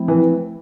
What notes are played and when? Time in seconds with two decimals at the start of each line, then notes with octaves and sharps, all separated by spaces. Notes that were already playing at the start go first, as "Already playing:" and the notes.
Already playing: F3 A3 C4 E4
0.08 E3